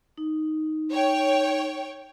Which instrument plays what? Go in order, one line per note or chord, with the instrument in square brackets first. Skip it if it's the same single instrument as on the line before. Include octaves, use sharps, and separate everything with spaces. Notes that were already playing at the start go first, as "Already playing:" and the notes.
[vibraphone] D#4
[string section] C#5 G5